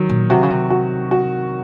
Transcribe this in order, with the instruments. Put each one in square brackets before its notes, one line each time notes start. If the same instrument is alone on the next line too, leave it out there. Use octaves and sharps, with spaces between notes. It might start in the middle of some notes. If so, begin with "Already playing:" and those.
Already playing: [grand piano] D#3 F#3
[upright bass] A#2
[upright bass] C3 [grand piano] F#4
[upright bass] C#3
C3
[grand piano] F#4
F#4